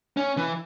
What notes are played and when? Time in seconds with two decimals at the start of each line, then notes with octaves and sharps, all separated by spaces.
0.17 C#4
0.37 E3